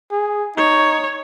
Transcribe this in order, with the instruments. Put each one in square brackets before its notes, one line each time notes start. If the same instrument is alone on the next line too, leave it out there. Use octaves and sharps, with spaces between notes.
[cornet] G#4
[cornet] D#4 [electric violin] C#5